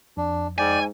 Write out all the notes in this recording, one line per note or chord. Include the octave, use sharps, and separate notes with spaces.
F2 D4
G#2 D5 G5 G#5